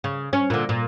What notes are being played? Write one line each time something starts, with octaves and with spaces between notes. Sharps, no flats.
C#3
C#4
A#2 D3
A#2